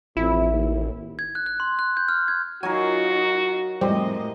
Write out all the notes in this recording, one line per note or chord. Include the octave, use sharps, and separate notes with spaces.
A1 F2 E4
D#2
G#6
F#6
F#6
C6
F#6
G6
F6
G#6
F#3 D#4 F4 F#4 A#4 G#5
F2 A2 G3 G#3 C4 G4 D#5 C6